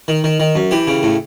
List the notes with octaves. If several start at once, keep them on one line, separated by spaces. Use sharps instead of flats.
D#3
D#3
D#3
F#2
E3 G4
C#3
A2